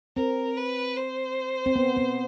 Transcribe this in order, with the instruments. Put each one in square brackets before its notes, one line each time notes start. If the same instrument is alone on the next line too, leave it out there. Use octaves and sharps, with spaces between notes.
[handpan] C4 [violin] A#4
[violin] B4
C5
[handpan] C4
B3
B3